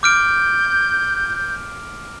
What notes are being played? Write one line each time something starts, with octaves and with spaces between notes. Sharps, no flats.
D6 F6 G6 D7